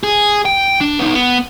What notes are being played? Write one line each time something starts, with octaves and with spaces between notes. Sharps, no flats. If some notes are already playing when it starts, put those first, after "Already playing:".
G#4
G5
D4
B3 D#4
B3